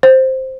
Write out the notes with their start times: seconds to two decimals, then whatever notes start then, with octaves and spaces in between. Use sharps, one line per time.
0.03 C5